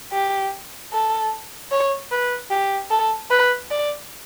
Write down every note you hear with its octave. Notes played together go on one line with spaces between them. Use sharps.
G4
A4
C#5
B4
G4
A4
B4
D5